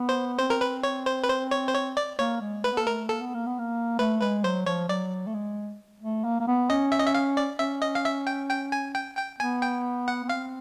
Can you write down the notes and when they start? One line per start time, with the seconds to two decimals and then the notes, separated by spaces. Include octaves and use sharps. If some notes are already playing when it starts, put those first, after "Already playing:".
Already playing: B3
0.09 C5
0.39 C4 C5
0.50 A#4
0.61 B4
0.83 C#5
1.06 C5
1.24 B4
1.29 C5
1.51 C#5
1.68 C5
1.74 C#5
1.97 D5
2.19 A#3 C#5
2.41 G#3
2.64 A3 B4
2.72 B3
2.77 A#3 A4
2.87 A3 A#4
3.09 A#3 A4
3.21 B3
3.34 A#3
3.46 B3
3.59 A#3
3.99 A3 B4
4.21 G#3 B4
4.44 F#3 C5
4.66 F3 C#5
4.89 F#3 D5
5.27 A3
5.34 G#3
6.01 A3
6.24 A#3
6.40 A#3
6.48 B3
6.70 C#4 D#5
6.92 E5
6.99 D#5
7.07 E5
7.14 F5
7.37 D5
7.59 C#4 E5
7.82 D#5
7.95 F5
8.05 E5
8.27 G5
8.50 G5
8.72 G#5
8.95 G5
9.17 G5
9.40 B3 G#5
9.62 G5
10.08 F#5
10.24 B3
10.29 C4 F5